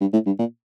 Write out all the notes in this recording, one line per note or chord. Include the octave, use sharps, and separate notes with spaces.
G2
A2
G2
A#2